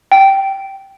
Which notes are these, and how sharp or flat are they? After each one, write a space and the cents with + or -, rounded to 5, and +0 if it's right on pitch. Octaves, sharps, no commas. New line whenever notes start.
G5 -10